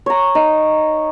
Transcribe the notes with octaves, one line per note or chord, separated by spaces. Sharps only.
C#5 A#5
D#4